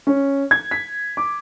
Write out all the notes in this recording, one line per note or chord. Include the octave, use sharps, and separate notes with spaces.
C#4
G#6
B6
D6